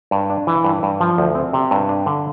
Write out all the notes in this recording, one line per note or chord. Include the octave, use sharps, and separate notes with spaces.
G2
D4
E3
G2
G2
F3
D2
C4
C3
G2
D4
D3